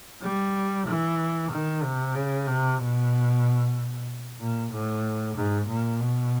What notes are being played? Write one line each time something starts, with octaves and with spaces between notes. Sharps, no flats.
G3
E3
D#3
C3
C#3
C3
B2
A#2
A2
G#2
A#2
B2